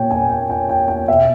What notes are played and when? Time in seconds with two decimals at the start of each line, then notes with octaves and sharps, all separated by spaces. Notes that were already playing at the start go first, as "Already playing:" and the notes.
Already playing: A#2 C#5 G5
0.11 G#5
0.30 G5
0.50 G5
0.69 G5
0.88 G5
1.08 B2 E5